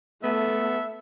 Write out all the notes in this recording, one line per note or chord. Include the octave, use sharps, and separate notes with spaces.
A3 B3 A4 E5